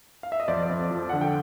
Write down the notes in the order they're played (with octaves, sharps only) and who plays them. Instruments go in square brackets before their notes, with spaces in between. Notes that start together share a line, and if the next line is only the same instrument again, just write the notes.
[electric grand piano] F5
E5
D#5
F2 C5 D5
F2
F3
D3 F#5
G5